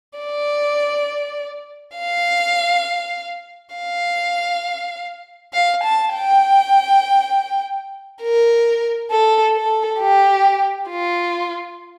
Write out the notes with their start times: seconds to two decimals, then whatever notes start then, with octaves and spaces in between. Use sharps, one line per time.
0.19 D5
1.97 F5
3.76 F5
5.53 F5
5.84 A5
6.14 G5
8.22 A#4
9.11 A4
9.56 A4
10.00 G4
10.90 F4